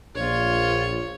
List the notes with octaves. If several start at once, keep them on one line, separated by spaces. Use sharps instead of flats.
A#1 F4 C#5